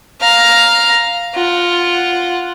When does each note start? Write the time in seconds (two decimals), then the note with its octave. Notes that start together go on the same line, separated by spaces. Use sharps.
0.21 F5 A#5
1.35 F4 F#5